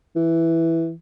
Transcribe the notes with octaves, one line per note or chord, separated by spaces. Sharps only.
E3